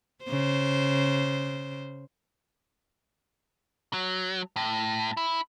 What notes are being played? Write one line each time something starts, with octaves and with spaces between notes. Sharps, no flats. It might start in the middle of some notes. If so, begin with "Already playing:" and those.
C#3 C5
F#3
A2
E4